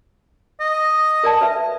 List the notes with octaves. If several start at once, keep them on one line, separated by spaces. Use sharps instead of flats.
D#5
A#4 D5 A5
B4 E5